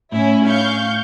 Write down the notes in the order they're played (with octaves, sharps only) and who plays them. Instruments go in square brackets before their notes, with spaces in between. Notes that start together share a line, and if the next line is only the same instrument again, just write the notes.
[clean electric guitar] A2 [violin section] C#4 E4
[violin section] F5 C#6 G6